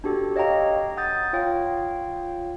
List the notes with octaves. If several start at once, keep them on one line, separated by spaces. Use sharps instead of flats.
D4 F#4 G4 A4
C#5 D#5 F5 G5 A#5
F#5 A#5 D#6 G6 A6
F4 C#5 F5 G5